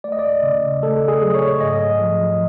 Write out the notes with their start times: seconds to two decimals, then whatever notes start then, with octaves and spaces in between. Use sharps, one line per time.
0.04 A3 D5
0.12 D#5
0.19 D5
0.43 C#3
0.82 A3 A4
1.08 G#4
1.22 F#3
1.35 C#5
1.61 G#2 D#5
2.00 F3